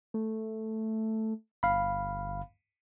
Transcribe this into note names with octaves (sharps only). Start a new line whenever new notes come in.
A3
G1 F5 B5